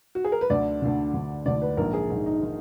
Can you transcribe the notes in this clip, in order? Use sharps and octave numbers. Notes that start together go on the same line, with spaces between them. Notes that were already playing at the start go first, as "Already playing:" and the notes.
F#4
G#4
A#4
B4
D2 D3 D5
D2 D3
D2 D3
D2 D3 D5
B4
A#1 G#2 D#3 A#4
G#4
A#1 G#2 D#3 D#4
D#4
D#3